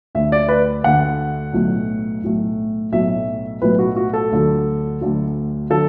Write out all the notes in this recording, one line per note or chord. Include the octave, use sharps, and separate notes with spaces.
D2 D3 A3 E5
D5
B4
D2 D3 A3 F#5
B1 A2 F#3 A3
B1 A2 F#3 A3
B1 A2 F#3 A3 E5
B1 A2 F#3 A3 B4
F#4
F#4
A4
D2 D3 F#3
D2 D3 F#3
D3 F#3 A4